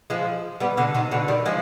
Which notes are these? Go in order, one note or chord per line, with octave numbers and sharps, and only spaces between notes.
F3 G#3
G3 B3
B2 D3
C3 D#3
B2 D3
D#3 G3
F3 G#3